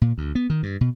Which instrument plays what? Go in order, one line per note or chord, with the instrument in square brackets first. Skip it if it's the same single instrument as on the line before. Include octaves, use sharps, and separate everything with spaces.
[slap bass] A#2
D2
B3
D#3
G2
B2